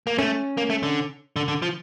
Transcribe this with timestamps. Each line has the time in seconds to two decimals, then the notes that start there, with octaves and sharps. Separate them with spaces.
0.07 A#3
0.18 A3 C#4
0.57 A#3
0.70 A3
0.83 D3
1.36 D3
1.48 D3
1.62 F3